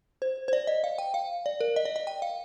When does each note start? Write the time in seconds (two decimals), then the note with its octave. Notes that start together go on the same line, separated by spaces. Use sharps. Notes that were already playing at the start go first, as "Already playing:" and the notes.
0.22 C5
0.48 C5
0.53 D5
0.67 D#5
0.84 F5
0.98 G5
1.14 F5
1.46 D5
1.61 A#4
1.76 D#5
1.85 D5
1.96 D#5
2.07 G5
2.22 F5